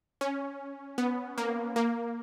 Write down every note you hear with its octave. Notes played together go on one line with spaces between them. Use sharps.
C#4
B3
A#3
A#3